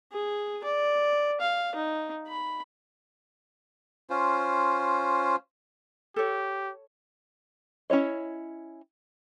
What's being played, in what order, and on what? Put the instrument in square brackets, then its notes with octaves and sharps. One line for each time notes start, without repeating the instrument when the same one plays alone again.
[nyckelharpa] G#4
D5
F5
D#4
B5
[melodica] C#4 F4 C5
[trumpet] G4 [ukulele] A4 C#5
[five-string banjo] C#4 E4 C#5 D#5